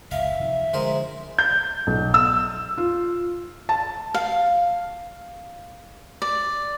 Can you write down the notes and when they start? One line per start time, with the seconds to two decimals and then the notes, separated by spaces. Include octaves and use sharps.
0.11 F1 C#2 E5 F5
0.40 C3 D#3 F3
0.73 D3 F3 G#3 A#4 C5
1.39 G6
1.87 B1
2.14 E6
2.78 F4
3.69 A5
4.14 F5
6.22 D5